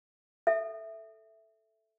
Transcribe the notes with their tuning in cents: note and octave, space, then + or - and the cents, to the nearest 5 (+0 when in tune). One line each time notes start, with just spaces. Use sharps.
A4 +0 E5 +0